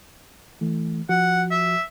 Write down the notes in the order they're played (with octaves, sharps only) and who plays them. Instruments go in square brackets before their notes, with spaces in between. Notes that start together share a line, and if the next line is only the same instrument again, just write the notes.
[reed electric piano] E3 A3
[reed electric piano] F3 F#4 [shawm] F#5
[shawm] E5